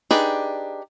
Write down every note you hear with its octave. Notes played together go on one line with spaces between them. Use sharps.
D4 D#4 G4 G#4 B4